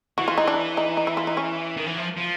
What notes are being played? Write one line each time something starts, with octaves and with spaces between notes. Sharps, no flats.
E3 F#4
F4
D#4
D4
D#4
D#4
E4
F4
D#4
C#4
D#3
E3
F3
F3